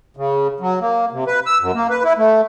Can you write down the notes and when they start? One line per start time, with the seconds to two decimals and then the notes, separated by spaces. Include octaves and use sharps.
0.17 C#3
0.60 F#3
0.81 A#3
1.12 C3
1.27 B4
1.46 E6
1.61 F#2
1.75 A#3
1.90 B4
2.04 E4
2.17 A3